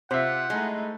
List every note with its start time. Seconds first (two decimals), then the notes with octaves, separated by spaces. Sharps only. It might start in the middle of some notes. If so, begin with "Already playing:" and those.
0.11 C3 F4 C5 E5 F#5
0.50 G#3 A3 D#4 E4